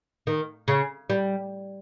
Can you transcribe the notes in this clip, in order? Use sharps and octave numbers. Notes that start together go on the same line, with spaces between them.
D#3
C#3
G3